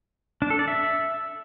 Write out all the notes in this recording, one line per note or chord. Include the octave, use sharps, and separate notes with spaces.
D4
A4
D5
E5